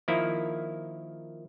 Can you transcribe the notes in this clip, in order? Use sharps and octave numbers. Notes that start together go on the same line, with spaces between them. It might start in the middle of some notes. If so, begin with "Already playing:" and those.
D#3 F3 A#3 E4